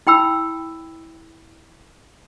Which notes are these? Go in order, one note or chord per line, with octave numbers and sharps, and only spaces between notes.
E4 G5 B5 E6